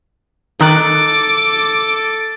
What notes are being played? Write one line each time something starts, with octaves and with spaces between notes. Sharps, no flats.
D#3 D#4 A4 D6 F#6